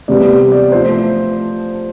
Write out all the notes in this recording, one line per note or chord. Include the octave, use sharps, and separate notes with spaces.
C3 E3 G3 B3 D5
D5
F3 A3 C5